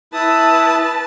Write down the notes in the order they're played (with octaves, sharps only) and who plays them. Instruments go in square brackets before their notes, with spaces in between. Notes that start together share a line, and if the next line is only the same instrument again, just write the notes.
[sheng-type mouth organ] E4 D#6 [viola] B4 A5